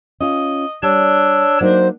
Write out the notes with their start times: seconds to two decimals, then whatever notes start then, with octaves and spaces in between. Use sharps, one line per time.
0.21 C#4 F4 D#5 F5
0.83 G3 D4 C#5 A5 E6
1.61 F#3 A#3 D#4 C5